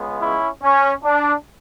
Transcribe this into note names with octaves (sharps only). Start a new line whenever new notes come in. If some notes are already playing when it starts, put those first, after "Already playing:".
Already playing: C#2 C#3 G#3 B3
C#4 E4
C#4
D4